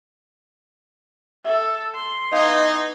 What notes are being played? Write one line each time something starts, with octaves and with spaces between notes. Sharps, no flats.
A4 E5
C6
E3 B3 D#4 D#5 F5